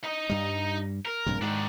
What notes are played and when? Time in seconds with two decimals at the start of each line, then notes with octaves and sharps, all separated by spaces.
0.04 D#4 D#5
0.30 G2 G3
1.05 A#4
1.26 A#1 G2 C3
1.42 G#2 D#3 G#3 D4